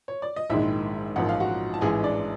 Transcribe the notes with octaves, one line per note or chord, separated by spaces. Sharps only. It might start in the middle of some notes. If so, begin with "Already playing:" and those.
C#5
D5
D#5
A#1 G#2 D#3 G#3 E4 E5
A1 G#2 F3 A#3 F#5
F5
F#4 F#5
A5
A1 G#2 E3 G#3 G#4 G#5
D4 D5